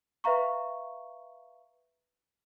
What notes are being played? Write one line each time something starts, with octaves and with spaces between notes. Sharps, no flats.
B4 E5 F5 A#5 C#6